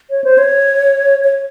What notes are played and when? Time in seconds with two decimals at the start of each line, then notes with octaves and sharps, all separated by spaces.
0.10 C#5
0.24 C5
0.38 C#5
1.24 C#5